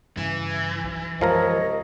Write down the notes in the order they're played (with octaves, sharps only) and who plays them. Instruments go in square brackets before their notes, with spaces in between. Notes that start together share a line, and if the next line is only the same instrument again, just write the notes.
[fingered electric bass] G2 C#3 [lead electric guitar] E3
[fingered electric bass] B1
[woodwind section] C2 C#5 D#5 [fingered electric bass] F#2 G#3 [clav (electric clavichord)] F3 A#4 A#5